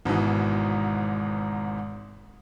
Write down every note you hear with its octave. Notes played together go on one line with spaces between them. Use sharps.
G#1 G#2 B2 E3